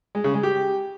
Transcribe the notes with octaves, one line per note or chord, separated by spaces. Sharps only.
G#3
C#3
G#3
G4